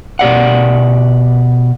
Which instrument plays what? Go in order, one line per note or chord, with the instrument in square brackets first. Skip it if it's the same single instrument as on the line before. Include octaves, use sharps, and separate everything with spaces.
[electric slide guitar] B2 G4 D5 F#5